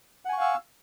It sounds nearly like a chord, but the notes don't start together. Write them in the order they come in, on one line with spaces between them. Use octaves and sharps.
F#5 G#5 C#6 F5 E6